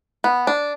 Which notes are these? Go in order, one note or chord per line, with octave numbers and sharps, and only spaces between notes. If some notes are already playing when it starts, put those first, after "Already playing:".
B3
D4